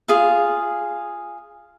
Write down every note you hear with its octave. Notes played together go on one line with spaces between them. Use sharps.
F4 G#4 F5